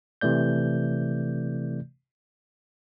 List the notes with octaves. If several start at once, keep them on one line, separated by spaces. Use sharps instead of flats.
C3 E3 A3 D5 G6